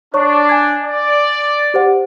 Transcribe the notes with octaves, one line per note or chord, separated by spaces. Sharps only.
D4 C#5 C#6
G#5 G#6
D5
G4 C5 F#5